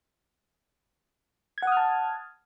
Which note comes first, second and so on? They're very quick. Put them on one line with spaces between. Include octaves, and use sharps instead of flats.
G#6 F#5 D#6 F6 A5